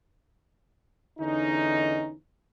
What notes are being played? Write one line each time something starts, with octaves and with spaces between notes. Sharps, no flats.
E2 D3 C#4 D#4